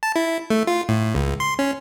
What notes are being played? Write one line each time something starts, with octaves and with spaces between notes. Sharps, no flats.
A5
E4
A3
F4
A2
C#2
C6
C#4